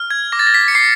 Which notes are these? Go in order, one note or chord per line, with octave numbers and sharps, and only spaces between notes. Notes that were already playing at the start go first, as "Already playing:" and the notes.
Already playing: F6
G#6
D6 A#6
A6
A#6
B6
C#7
D6 C7